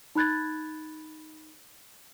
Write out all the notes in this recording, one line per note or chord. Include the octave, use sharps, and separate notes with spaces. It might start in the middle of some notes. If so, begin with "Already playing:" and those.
D#4 B5 F#6 G#6 A6